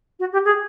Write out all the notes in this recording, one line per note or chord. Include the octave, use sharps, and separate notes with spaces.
F#4
G4
G#4